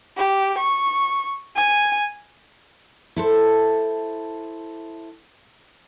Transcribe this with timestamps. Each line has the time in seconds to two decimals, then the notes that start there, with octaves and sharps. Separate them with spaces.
0.17 G4
0.58 C#6
1.56 G#5
3.16 E4 A4 C5